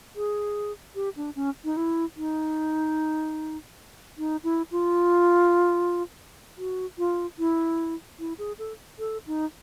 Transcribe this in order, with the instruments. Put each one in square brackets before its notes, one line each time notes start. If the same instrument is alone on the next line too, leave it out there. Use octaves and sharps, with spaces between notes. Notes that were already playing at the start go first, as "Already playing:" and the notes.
[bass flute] G#4
G4
D4
C#4
D#4
E4
D#4
D#4
E4
F4
F#4
F4
E4
E4
G#4
A4
A4
D#4